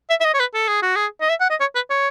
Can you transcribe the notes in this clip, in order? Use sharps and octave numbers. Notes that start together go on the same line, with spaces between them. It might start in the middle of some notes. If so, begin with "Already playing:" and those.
E5
E5
D#5
C#5
B4
A4
G#4
F#4
G#4
D#5
E5
F#5
D#5
C#5
B4
C#5